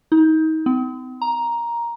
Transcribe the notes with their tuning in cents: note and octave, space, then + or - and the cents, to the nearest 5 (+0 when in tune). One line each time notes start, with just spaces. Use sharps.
D#4 +30
C4 -45
A#5 +10